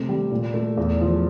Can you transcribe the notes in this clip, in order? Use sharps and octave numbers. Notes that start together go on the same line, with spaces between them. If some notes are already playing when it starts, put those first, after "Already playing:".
Already playing: C3 A3
G3
A#2
A3
E2
F3